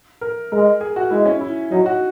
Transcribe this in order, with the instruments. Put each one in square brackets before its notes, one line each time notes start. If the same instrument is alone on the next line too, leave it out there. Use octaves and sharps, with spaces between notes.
[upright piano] A#4
[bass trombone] G#3 [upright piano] A#4
[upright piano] G#4
F#4
[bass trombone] G#3 [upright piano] E4
[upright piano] C#4
E4
[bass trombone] F#3 [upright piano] D#4
[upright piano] F#4